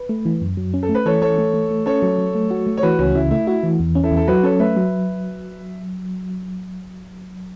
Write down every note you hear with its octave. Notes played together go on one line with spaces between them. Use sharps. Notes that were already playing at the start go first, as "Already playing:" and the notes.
Already playing: B4
A3
E3
F#2
F#3
C#4
A4
A3
B4
E3 A4 C#5
E3 A4 C#5
A3
A3
A3
C#4 A4 C#5
F#3
F#3
A3
F#4
A3
C#5
E3 F#4 B4
C#2 C#4 F#4
C#3 E4
A3 E4
E4 F#4
E3
E2
C#4
E4 A4
E2
A4
F#3 F#4 B4
C#4 A4 C#5
A3 B4 E5
F#3